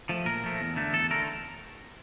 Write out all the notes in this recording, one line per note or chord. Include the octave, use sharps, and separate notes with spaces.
F3 A3
A#2 A#4
F3 A3
E2
D3 A3
E2 A4
D3 A3 A#4